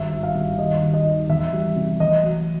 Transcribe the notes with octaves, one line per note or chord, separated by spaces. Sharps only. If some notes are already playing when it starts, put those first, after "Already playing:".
Already playing: G#1 G2 E5
G#1
F5
G2
D#2 D#5
D#2
D#5
D#3
E2 E5
G3
C3
A1 D#5
F#3